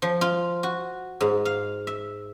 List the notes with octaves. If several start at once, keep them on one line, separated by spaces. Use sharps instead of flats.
F3
F4
F#4
G#2
F5
E5